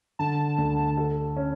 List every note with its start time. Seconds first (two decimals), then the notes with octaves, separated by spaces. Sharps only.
0.19 D3 A5
0.58 D2
0.97 A4
1.37 C#4